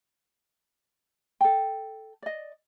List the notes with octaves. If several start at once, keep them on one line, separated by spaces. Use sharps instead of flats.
A4 G5
D5 D#5